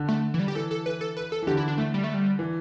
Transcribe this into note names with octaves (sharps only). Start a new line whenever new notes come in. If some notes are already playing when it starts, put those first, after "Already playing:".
Already playing: D3
A3
E3
G3
G4
E3 A4
A4
E3 B4
A4
B4
A4
E3
D3 G4
E4
D4
A3
G3
A3
G3
E3